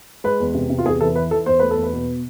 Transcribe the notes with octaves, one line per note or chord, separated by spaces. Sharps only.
G#3 B4
E2
C3
C3
F4
E2 G#4
E3 A4
E3 B4
E3 A4
E2 C5
A3 B4
A4
E2
B4
B2